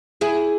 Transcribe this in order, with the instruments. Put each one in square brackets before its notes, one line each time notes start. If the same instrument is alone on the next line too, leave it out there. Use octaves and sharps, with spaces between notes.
[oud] E4 G#4